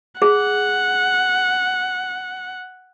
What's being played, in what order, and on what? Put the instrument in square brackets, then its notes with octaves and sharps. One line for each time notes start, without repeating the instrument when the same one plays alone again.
[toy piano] G#4 [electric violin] F#5